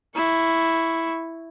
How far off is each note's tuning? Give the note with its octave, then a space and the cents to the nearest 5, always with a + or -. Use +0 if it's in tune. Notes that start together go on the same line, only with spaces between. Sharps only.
E4 +0 C#6 +0